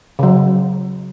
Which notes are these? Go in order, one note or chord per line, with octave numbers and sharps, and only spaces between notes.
C#3 F#3